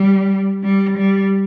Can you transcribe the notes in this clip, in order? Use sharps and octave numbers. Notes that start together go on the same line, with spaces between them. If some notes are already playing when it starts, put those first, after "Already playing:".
Already playing: G3
G3
G3